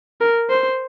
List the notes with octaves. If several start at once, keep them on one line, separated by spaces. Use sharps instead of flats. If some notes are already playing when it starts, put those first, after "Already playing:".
A#4
C5